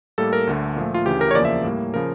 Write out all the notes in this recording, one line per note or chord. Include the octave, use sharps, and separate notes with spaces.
A2 G3 A#3 A4
A#4
D2 D3 A3
A#2 F3 A3
F4
D2 C#3 E3 G4
A#4
C#5
E2 C#3 F3 A#3 D5
E5
A2 G3 A#3
C#3 F3 A#4